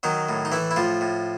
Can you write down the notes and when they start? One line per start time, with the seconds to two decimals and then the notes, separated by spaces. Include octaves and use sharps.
0.03 D#3 F#3 D#4
0.29 A2
0.45 D#4
0.52 E3 A3 E4
0.71 E4
0.76 A2 F3 F4
1.01 A2